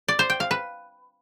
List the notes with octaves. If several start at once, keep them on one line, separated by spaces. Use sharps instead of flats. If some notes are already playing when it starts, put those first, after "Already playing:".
D5
C5
G5
F5
B4